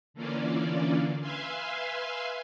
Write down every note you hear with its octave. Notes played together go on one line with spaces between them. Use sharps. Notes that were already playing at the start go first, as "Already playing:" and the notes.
D3 E3 A#3 C#4 F4 D5
B4 E5 F5 G#5 C6